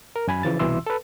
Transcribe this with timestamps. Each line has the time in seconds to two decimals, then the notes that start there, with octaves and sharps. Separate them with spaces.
0.16 A#4
0.28 F#2 G#5 B5
0.43 C#3 E3 F3 A6
0.59 C2 B2 E3 E5 C6 E6
0.87 A4 B4